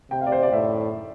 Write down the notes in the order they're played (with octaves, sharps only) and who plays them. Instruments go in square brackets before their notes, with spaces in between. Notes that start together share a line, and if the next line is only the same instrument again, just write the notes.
[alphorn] C3 [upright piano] G5
[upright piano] F5
D5
C5
D5
[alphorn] A2 [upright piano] E5